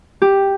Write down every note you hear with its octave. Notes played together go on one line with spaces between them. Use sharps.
G4